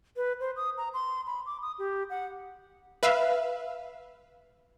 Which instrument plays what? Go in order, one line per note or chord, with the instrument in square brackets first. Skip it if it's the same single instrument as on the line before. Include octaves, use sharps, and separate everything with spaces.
[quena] B4
C5
D#6
A#5
C6
B5
D6
D#6
G4
F#5
[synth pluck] B4 E5 F5